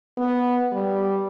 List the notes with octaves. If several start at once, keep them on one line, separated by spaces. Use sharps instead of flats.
B3
G3